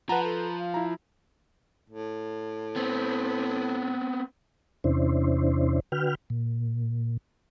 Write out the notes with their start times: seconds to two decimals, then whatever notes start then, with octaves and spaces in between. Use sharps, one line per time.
0.09 F3 B4 F#5 A5 A#5
0.24 A4
0.59 F5
0.74 E4 A#5
1.90 A2
2.76 B3 C4
4.84 E2 C3 C#4 D4 E4 C5
5.92 D3 F#4 B4 G5 F6
6.30 A#2